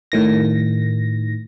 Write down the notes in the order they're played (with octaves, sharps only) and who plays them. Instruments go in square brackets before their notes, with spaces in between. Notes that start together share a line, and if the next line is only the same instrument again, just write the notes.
[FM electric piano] A2 D#3 A#6